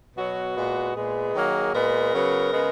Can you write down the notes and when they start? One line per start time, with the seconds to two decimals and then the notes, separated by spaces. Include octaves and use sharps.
0.16 B2 F#3 B3 F#4
0.55 A#2 G#3 B3
0.95 A#2 G#3 B3 G#4
1.34 D#3 F#3 A#3
1.74 A#2 G#3 B3 A#4
2.13 C#3 F#3 B3
2.53 C#3 G#3 B3